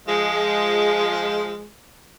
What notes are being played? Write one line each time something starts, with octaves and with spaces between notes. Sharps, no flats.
F3 G#3